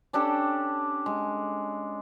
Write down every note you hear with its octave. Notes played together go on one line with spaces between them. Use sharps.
C#4 D4 G4 A4
G#3